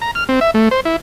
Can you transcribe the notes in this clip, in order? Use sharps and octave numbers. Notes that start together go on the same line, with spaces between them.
A#5
F6
C4
E5
A3
C5
E4